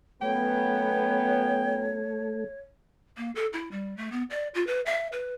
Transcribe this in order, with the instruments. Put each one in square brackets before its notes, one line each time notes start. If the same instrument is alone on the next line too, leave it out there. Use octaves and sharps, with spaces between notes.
[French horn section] F#2 F#3 B3 [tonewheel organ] A3 [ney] C#5 [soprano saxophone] G5
[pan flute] A#3
A4
E4
G3
A3
B3
D5
F4
B4
E5
B4